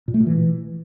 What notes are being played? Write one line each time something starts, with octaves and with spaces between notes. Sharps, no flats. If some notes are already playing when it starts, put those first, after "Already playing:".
A#2
A3
A#2
E3